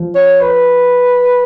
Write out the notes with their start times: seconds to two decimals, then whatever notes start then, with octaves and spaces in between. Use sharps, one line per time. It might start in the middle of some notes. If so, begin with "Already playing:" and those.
Already playing: F3
0.15 C#5
0.41 B4